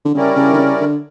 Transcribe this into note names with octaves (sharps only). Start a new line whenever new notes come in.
D3
C#3 G3 C#4 E4 A#4 D5
C#3
D3
C#3
D3